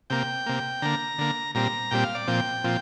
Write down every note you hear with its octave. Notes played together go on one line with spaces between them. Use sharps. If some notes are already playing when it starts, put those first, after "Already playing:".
C3 A#3 G5
C3 A#3
D3 A#3 A#5
D3 A#3
A#2 G3 C4 A#5
A#2 G3 C4 G5
F5
D5
A#2 F3 C4 G5
A#2 F3 C4